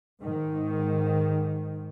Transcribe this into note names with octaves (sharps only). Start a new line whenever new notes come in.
G#2 D#3